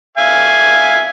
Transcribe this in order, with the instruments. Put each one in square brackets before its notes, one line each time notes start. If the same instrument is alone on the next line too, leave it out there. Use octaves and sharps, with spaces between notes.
[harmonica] E5 F5 G#5